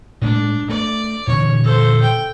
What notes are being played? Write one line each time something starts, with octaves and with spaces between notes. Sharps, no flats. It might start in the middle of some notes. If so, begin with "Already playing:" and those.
A2 G#3 A3 D4
A3 D5
A#2 D3 E3 C#5
A4 C5
G5